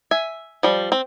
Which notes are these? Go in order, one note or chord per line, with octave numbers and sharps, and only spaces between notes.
E5 G#5
F3 G3
C4